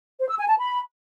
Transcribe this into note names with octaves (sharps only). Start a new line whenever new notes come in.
C5
E6
G#5
A5
B5